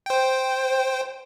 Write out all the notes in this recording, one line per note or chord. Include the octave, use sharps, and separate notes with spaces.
C5 G5